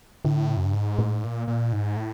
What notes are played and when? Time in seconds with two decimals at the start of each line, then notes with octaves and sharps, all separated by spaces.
0.25 A2 D3
0.50 C#3
0.57 F#2
0.65 G2
0.73 G#2
0.99 A2
1.24 A#2
1.48 A#2
1.73 G#2
1.96 A2